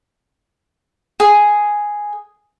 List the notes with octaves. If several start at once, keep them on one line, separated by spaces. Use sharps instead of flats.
G#4